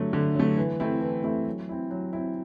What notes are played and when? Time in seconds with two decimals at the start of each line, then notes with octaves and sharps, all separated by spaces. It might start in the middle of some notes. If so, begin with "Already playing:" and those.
Already playing: D3 F#3 A3
0.13 D3
0.35 F#3 A3
0.57 E3
0.80 A3 C4 E4
1.01 E3
1.24 A3 C4 E4
1.47 F#3
1.69 C4 E4
1.91 F#3
2.13 C4 E4